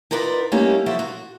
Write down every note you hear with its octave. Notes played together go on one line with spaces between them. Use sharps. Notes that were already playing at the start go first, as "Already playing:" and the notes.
D#4 F4 A#4 B4 D5 F#5
G3 A3 A#3 C#4 D#4 G4
F3 F#3 F4 F#4 A4 E5
F#4